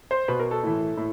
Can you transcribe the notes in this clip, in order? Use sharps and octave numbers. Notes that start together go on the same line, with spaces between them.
C5
B2 B4
A#4
A4
A2 E3
A2